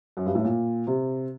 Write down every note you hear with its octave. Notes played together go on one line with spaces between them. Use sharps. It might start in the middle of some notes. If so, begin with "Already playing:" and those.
F#2
G2
A2
A#2
C3